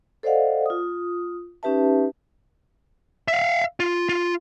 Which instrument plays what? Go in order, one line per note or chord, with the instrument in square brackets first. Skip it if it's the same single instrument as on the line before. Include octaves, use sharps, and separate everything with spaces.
[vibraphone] A4 C5 D5 D#5 F5 F#5
F4 D#6
C#4 D#4 G4 B4 E5 A5
[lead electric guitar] E5 F5
F4
F4